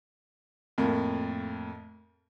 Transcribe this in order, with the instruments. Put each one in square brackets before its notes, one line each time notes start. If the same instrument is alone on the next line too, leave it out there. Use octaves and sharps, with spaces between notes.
[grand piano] F2 A2 A#3